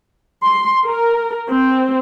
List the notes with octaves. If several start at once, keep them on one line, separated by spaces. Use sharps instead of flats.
C6
A#4
C4